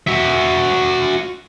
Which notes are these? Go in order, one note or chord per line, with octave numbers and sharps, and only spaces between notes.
F#4 E5